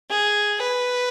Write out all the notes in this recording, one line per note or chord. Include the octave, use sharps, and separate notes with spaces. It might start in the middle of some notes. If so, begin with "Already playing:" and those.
G#4
B4